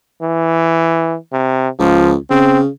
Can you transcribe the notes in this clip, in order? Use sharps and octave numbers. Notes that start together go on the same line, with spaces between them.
E3
C3
C#2 F3
C#3 C4